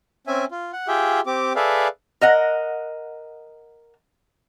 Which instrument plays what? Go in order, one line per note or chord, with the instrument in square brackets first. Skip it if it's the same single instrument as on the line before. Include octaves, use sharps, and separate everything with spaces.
[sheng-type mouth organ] C4 C#4 E5 G#5
F4
F#5
F4 G4 G#4 E5 G5
C4 G4 D6
G#4 A4 B4 D5 E5 F5
[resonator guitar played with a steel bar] A#4 D#5 F#5